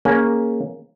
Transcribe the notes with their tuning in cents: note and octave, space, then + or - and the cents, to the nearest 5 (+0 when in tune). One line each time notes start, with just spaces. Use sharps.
A#3 +0 C#4 +0 G#4 +0